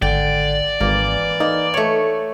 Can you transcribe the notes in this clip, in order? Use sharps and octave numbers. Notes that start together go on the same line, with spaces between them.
G#1 D3 D5 G5
G#1 E3 A#3
A#3 D#4
A3 C#5